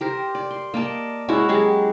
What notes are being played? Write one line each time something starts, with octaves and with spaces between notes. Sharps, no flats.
G4 A#4 C5
D5
C6
A#3 D5 D#5 A5
G#3 C#4 E4 F#4
F#3 G#3 G4 G#4